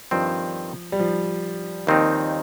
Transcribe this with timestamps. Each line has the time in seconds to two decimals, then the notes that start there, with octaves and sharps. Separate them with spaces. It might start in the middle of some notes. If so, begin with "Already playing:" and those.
0.11 G2 D#3 F3 C4
0.92 G3
0.99 F3
1.87 D#2 D#3 C4 D#4